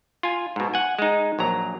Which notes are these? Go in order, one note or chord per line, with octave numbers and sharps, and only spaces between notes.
F4 G#5
G#2 B2
F#5 G#5
G#3 D#4
A#1 F#3 A#5